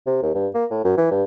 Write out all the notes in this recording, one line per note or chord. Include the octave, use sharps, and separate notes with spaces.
C3
D#2
G2
A#3
A2
F#2
E3
G2